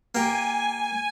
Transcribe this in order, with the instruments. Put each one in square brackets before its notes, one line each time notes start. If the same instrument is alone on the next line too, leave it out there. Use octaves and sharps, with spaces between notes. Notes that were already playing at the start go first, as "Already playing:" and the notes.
[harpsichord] A#3 G4 [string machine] G#5